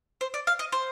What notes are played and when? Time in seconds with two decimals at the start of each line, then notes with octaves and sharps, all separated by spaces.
0.21 C5
0.34 D5
0.47 F5
0.59 D#5
0.72 C5